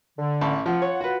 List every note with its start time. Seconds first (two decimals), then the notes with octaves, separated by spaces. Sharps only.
0.19 D3
0.41 A1 A5 B5
0.66 F3 F4 F#5
0.82 C#5
1.01 F#4 B4